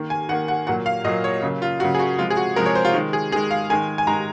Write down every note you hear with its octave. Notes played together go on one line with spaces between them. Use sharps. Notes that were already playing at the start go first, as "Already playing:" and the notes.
Already playing: D#3 A#3
G#5
D#3 A#3 F#5
F#5
A#2 F#3 A#3 F#5
F5
A#2 F#3 A#3 D#5
C#5
C#3 F#3 A#3
F4
C#3 F#3 A#3 F#4
G#4
F#4
C3 F3 G#3 F4
G#4
F#4
C3 F3 G#3 A#4
C#5
C5
F4
D#3 G#3
G#4
D#3 G#3 G#4
F5
D#3 G#3 G#5
G#5
D#3 G#3 A#5